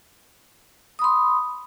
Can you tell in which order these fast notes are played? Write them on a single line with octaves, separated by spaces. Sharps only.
D#6 B5 C6